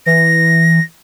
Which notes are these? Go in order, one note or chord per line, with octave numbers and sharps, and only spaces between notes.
E3 A#6